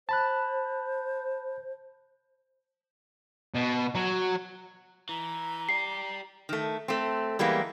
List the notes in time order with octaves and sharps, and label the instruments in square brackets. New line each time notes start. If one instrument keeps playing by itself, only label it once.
[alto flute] C5 [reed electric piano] A5 B5 F#6
[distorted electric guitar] B2
F#3
[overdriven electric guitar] E3 [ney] A#5
[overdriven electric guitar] G4 D5 [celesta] C7
[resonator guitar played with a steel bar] D#3 A3
A3 C4
E3 G3 G#3 A#3 B3